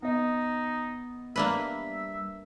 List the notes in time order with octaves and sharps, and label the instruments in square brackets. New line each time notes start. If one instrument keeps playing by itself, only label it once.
[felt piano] B3 D#5 [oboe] D#4
[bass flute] G3 [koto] A#3 D4 B4 [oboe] E5